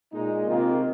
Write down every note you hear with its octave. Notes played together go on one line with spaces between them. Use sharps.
A#2 G#3 D#4
C3 D#3 A#3 F4